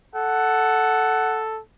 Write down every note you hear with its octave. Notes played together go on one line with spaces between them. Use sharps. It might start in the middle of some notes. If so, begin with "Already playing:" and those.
A4 F#5